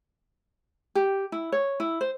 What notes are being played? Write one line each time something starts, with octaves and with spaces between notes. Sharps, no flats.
G4
E4
C#5
E4
C5